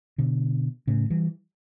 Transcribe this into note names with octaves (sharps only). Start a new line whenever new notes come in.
B2 D3
A2 C#3
E3 G3